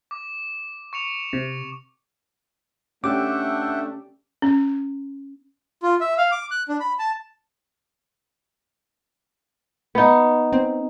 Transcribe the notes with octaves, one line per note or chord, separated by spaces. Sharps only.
D6
C#6 C#7 F7
C3
A3 C#4 D4 G4 E5 F#5 G5 D6
C#4
F4
E5
F5
D6
F#6
D4
B5
A5
B3 D#4
C4